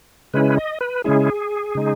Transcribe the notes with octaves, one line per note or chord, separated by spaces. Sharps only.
C#3 G#3 C#4 E4 B4
D#5
B4
C#3 G#3 C#4 E4 G#4
C#3 G#3 D#4